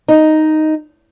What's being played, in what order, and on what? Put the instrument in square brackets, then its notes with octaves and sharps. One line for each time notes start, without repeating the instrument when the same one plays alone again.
[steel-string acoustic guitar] D#4